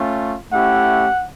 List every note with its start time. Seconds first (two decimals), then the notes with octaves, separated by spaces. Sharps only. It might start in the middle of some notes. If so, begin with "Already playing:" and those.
Already playing: A3 C#4 F4
0.52 A3 C#4 E4 G4 F#5